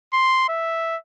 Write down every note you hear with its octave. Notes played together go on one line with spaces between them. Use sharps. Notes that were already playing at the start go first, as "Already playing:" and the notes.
C6
E5